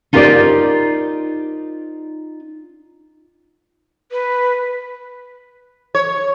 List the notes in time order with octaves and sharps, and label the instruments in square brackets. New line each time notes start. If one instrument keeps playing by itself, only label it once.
[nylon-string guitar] D#4 F4 G4 A#4 C5 D5
[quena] B4
[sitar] C#5